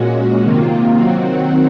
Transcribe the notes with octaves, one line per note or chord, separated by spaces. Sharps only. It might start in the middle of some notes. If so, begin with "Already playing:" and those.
Already playing: A#2 G#3 C#4 F#4
C3 D#3 A#3 F4
D#3 F#3 C4 F#4